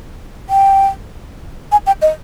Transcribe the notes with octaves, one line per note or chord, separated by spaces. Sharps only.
G5
G#5
G5
D#5